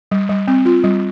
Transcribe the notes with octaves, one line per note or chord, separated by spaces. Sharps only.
G3
G3
C4
F4
G3